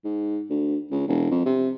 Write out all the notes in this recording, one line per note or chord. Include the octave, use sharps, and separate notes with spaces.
G#2
D2
C#2
E1
F2
C3